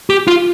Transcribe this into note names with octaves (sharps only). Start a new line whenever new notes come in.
G4
F4